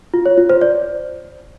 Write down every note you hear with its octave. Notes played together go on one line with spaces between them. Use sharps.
F4
C#5
F4
C5
D5